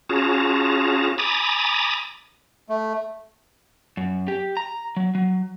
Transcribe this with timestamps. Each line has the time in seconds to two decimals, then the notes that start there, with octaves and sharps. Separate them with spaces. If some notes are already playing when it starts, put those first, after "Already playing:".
0.09 C#4 F4 F#4 G#4 A5 A#5
1.18 G#5 A#5 B5 D6 D#6 A6
2.69 A3
3.97 F#2
4.28 G4
4.57 A#5
4.97 F#3
5.15 F#3